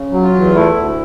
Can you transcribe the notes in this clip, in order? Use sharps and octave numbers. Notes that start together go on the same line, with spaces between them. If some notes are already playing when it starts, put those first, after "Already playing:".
Already playing: C#3
F#3
F4
E2
A3 E4
D2